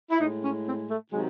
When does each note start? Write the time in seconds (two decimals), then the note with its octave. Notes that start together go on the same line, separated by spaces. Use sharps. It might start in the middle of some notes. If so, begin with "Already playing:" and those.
0.11 E4
0.19 A2 G#3 D#4
0.42 C#4
0.66 C4
0.88 A3
1.12 C3 D#3 F#3 G#3